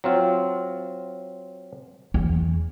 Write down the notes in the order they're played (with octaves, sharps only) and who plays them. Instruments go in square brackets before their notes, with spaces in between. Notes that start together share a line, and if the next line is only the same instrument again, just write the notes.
[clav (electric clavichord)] F#3 C4 F4
[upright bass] E2